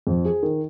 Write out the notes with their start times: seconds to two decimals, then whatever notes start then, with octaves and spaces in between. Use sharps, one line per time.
0.07 F2
0.25 G#4
0.43 D#3